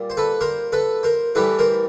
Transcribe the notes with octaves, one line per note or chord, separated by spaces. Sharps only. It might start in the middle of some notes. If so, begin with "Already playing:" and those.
Already playing: A#2 G3
C5
A4 B4
A#4 C5
A4 B4
A#4 C5
A2 E3 G3 A4 B4
A#4 C5